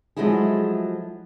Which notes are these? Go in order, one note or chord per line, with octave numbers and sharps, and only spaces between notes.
F3 F#3 G#3 A3 E4 G#4